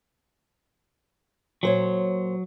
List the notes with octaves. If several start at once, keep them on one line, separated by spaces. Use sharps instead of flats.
A#2 F#3 C5 C#5